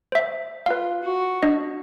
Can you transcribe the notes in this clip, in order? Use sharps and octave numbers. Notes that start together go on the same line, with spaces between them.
C5 E5
F4 B4 F5
F#4
D4 D#5